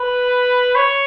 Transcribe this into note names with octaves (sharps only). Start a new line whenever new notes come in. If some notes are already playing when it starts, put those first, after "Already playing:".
Already playing: B4
C#5